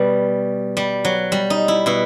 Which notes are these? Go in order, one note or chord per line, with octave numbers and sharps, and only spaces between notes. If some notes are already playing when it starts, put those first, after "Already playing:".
Already playing: B2 G3
G3
F#3
G3
D#4
E4
B2 E4